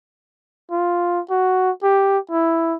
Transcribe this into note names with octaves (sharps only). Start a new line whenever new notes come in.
F4
F#4
G4
E4